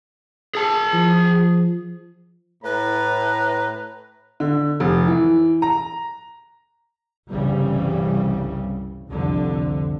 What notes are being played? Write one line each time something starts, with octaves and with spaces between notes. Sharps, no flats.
G#4 A5
F3
A2 B4 A#5
D3
F1
E3
A#5
G1 C2 C#3 E3 G3
C2 F2 D3